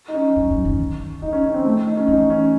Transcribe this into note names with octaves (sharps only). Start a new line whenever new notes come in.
D#4
C#4
F#2
F#2
D#3
D#3
D#3 D#4
C#4
C#4
C4
A3
D#4
C#4
E3 D#4
C#4